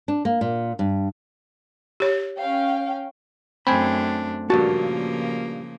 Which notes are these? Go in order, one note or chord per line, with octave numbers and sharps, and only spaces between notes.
D4
A#3
A#2
G2
G4 C#5
C#4 F5 G5
F#2 A3 C4 D4 G5 G#5 B5
G2 A#2 C#3 F3 A#3 F#4 A5